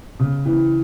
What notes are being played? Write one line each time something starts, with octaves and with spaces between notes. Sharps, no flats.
C#3
E3